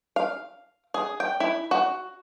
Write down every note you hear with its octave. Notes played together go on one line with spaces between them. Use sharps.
F5
G#4
G5
E4
F#4